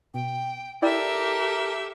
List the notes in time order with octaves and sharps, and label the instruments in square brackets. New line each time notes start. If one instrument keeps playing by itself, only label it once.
[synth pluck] B2 [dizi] G5
[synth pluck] E4 D5 G5 [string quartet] G4 A4 E5 [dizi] A#4